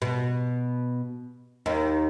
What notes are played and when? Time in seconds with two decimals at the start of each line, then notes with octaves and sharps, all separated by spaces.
0.02 B2
1.66 D#2 D#3